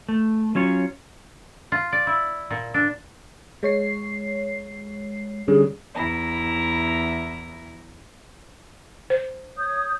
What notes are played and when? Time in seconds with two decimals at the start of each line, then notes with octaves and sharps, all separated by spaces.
0.09 A3
0.55 F#3 C#4 F4 C#5
1.72 F4
1.92 D5
2.07 E4
2.50 A#2
2.74 D4
3.63 G#3 C#5 C7
5.48 D3 G3 C#4 G#4
5.95 E2 E4 A#5
9.10 C5
9.57 C#5 D#6 G6